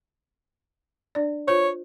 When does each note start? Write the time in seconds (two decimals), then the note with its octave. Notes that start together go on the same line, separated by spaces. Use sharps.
1.15 D4 D5
1.48 F4 C5 C#5